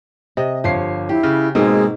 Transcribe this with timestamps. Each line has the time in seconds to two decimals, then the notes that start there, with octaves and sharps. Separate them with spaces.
0.37 C3 D#5
0.64 G1 F3 C#5 C7
1.09 E4 G4
1.23 C#3
1.55 G#2 B2 G#3 A#3 C4